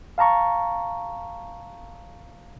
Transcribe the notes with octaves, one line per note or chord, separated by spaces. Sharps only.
F5 A5 A#5 C#6